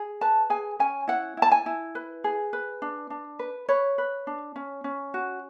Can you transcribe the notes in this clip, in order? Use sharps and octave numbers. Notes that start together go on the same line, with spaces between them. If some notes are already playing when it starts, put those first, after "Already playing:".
Already playing: G#4
B4 A5
G#4 G#5
C#4 G#5
E4 F#5
E4 A5
G#5
E4
B4
G#4
B4
D4
D4
B4
B4 C#5
B4
D4
C#4
C#4
F#4